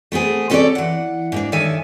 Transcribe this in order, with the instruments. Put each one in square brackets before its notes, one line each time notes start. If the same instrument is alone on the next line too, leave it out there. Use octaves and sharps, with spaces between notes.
[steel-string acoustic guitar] A3 B3 C4 G#4
C4 C#4 A4 B4 C#5 D5
E3 F#5
G#2 A#3 D4
G2 D#3 A4 C#5 E5 G#5